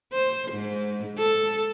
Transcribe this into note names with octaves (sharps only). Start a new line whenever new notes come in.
C5
G#2
A4